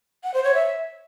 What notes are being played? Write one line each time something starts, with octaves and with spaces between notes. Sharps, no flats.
F#5
C5
C#5
E5